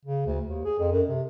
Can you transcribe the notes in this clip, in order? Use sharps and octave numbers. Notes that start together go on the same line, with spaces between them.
C#3
D2
D#2
G#4
F2
F#2
C3